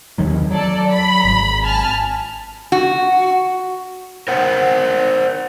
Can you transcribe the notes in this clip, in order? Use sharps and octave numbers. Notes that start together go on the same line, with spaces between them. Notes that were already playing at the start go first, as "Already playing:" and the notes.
D#2 D#3 F#3
F#3 A4 D5
B5
G#1
G#5 A5 F6
F#4
A#4 C5 F#5